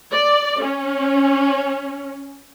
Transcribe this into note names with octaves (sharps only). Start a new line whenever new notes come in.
D5
C#4